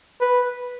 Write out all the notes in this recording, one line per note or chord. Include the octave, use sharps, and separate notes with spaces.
B4